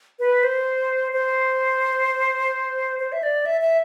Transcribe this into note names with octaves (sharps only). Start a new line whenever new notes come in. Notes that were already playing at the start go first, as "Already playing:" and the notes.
B4
C5
C5
C5
E5
D5
E5
E5